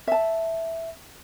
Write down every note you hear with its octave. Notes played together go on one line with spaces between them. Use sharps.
E5 A5